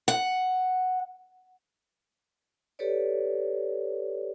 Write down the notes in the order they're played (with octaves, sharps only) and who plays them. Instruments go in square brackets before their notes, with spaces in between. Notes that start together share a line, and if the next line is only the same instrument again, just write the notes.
[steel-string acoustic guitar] F#5
[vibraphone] G4 A4 B4 C#5 D5